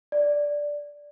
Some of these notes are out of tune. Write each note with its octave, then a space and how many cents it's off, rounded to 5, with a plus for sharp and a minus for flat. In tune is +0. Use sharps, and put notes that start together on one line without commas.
D5 -5